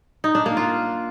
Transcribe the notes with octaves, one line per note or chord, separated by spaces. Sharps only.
D#4
D4
A#3
F4